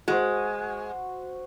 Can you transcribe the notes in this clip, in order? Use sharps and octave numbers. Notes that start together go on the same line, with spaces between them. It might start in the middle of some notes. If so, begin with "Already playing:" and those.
G#3 F#4 C5